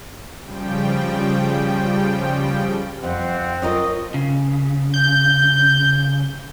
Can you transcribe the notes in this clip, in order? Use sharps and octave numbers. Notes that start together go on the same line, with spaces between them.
C#3 F3 G3 G5
F2 C4 F#5
C#4 F4 A#4 D#5
C#3
G6